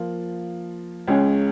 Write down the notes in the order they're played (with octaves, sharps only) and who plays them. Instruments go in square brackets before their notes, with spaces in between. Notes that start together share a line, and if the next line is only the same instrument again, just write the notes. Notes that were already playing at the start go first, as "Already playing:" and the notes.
Already playing: [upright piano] F3 A#3 F4
C#2 C#3 G#3 C#4 G#4